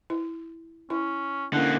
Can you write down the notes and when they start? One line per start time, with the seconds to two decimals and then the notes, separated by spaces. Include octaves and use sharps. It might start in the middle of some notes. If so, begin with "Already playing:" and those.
0.10 E4
0.90 C#4 E4
1.53 D3 A#3 C#4 E4 F#5